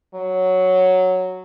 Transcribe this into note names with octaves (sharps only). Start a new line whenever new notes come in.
F#3